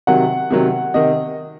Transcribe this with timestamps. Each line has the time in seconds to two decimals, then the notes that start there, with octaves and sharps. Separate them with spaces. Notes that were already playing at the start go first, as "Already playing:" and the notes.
0.07 C3 D#3 F#3 F#5
0.51 C3 D#3 F#3
0.94 C3 D#3 D#5